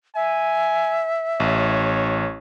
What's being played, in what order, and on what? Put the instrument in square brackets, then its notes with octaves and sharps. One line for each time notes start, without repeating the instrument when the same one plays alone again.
[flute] E5 [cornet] G#5
[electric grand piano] A1 [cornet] C#5